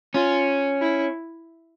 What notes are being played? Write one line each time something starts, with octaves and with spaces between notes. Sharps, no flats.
C#4 F4
E4